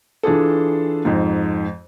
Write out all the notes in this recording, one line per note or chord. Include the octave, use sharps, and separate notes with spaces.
E3 D4 F4 G#4 A4
F2 G#2